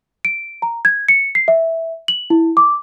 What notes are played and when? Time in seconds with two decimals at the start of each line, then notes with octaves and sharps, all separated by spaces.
0.25 D7
0.62 A#5
0.85 G#6
1.09 C#7
1.35 C7
1.48 E5
2.08 F#7
2.30 E4
2.57 D6